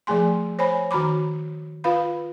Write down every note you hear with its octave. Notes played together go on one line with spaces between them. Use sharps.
F3 A3 G#4 G#5 C6
C5 C#5 G#5 B5
D#3 F#4 A#5 B5 D6
F4 B4 F5 B5